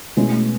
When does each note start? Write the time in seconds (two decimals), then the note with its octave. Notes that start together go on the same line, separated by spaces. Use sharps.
0.17 B2 G#3 A3 C#4 E4 G#4
0.32 A3